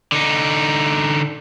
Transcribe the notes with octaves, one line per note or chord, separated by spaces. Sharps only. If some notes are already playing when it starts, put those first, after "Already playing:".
D3 D#4